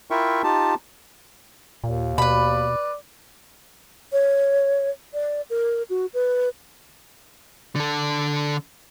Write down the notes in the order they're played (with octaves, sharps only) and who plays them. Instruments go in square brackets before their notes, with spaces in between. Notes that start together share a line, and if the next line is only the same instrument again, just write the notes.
[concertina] E4 F4 A#4 E5 G5 C#6
D#4 F4 G4 A5
[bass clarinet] D#2 [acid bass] A#2
[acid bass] B2 [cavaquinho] B4 B5 [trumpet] D5
[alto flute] C#5
D5
A#4
F#4
B4
[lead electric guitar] D3 A4